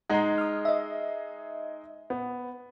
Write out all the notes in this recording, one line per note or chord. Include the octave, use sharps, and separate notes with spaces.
G#3 D#4 G#4 F#5 A#5
D#6 F6
D#5 E5
B3